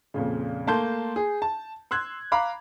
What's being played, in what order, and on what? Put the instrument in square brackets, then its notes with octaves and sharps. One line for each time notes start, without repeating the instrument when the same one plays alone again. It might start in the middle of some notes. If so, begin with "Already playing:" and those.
[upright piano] F2 A#2 C#3
A3 A#3 A5 C6 G6
G#4
A5
C6 E6 F#6 G#6
F5 A#5 B5 D6